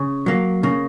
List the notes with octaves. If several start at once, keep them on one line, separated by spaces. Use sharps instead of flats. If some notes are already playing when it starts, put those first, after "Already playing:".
Already playing: C#3
F#3 A#3
C#3 A#3